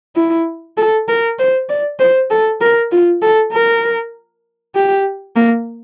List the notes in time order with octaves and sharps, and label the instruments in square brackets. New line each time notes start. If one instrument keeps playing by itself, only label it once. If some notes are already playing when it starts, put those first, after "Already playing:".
[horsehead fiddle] E4
A4
A#4
C5
D5
C5
A4
A#4
F4
A4
A#4
G4
A#3